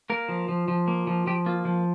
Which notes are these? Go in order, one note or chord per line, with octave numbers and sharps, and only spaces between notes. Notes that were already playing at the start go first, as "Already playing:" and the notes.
A#3 A#4
F3
F3
F3
A#3
F3
F3 G4
A#3 F4
F3